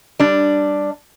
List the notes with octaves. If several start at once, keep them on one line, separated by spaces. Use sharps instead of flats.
G3 D4